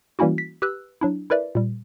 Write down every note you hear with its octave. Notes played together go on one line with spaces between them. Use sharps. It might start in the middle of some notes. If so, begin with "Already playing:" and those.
E3 G3 A#3 C#4 E4 F#4
B6
G4 B4 E6 F#6
F#3 D4 E4
E4 A#4 B4 D5 E5
A#2 G3